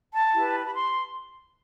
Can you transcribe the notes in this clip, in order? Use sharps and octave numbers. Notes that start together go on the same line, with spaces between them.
A5
E4 G4 B4
B5
C6